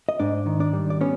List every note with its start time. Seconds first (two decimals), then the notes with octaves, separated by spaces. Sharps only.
0.09 D#5
0.19 G#2 D4 D5
0.46 D#3
0.60 D4 D5
0.73 G3
0.90 D5
1.01 B3 C#4 C#5